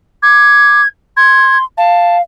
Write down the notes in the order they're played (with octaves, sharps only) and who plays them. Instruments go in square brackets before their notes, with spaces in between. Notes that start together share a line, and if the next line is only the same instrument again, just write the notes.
[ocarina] D6 [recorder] G#6
[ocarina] C6 [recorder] G#6
[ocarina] F5 [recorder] A5